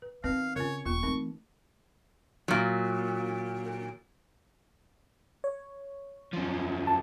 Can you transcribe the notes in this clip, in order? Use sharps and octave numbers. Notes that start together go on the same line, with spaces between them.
B4
D#3 B3 C4 B4 F5
C#3 C#4 F4 A#4 C#5
D#1 B3 F4 C#6
E3 A3 C4 D#4 A#4
A#2 F#3
C#5
F#2 F3
A5